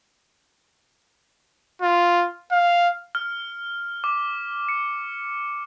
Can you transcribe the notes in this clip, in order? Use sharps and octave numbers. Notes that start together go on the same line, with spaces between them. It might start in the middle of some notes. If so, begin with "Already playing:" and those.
F4
F5
F6
D6
C#7